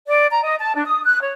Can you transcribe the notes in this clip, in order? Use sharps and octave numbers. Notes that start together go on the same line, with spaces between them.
D5
A#5
D#5
A5
D4
D#6
F#6
C#5